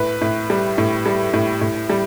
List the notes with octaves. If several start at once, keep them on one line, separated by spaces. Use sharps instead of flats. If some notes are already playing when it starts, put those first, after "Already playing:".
Already playing: A2 B4
A2
G3
A2
G3
A2
A2
G3